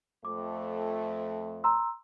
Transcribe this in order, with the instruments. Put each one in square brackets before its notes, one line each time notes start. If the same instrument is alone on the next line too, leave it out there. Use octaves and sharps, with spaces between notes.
[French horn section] F2 A3 [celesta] D6
[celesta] A#5 C6 E6